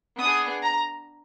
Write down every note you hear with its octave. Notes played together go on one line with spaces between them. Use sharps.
B3 D4 G#4 D#6
A#5